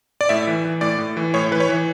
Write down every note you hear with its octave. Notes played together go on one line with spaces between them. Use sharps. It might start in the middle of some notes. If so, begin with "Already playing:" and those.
D5
A2 E5
E3
E3
A2 D5
A2
E3
A2 C#5
E3 B4
C#5
E3